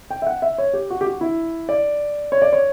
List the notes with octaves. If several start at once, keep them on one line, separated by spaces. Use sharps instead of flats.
G5
E5
F#5
E5
C#5
G4
F#4
G4
F#4
E4
D5
C#5
D5
C#5